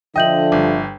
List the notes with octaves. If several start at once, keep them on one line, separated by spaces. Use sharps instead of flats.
D3 F3 D#5 E5 G5 G6 F#7
G1